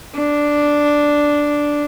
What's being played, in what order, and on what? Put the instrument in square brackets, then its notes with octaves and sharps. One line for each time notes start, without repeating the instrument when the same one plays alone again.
[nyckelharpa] D4